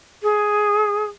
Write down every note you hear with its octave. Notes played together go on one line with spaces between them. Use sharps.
G#4